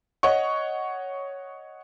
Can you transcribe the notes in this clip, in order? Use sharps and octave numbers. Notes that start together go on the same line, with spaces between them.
C#5 D#5 F#5 C#6